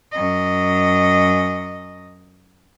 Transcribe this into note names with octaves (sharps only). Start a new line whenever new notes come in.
F#2 D#5